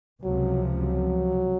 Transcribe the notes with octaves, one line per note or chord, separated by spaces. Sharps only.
C#2 C3 F3 F#3
F#3